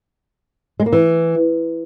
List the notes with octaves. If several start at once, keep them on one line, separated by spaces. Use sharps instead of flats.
G#3
A#3
E3